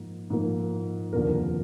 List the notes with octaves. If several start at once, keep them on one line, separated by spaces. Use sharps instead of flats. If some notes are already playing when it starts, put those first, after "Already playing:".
Already playing: G#2 F3 A#3
G#2 F3 A#3
F1 D#2 D3 F3 A#3 A#4